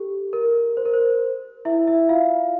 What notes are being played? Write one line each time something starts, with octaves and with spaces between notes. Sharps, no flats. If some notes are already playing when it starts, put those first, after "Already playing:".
Already playing: G4 A4
A#4
C5
A#4
C5
E4 E5
E4 E5
F4 F5